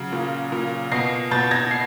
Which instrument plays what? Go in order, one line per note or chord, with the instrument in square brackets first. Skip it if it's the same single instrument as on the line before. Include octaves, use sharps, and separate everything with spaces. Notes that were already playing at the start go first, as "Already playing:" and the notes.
Already playing: [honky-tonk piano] C#3 F#3
A#2
A#2
B2 A#6 C7
B2 G6 A6
G#6 A#6
C7